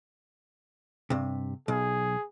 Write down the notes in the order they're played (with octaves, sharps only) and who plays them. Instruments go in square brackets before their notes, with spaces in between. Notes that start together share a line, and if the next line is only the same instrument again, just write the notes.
[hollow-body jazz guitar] G2 C3
[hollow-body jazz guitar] B1 [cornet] G#4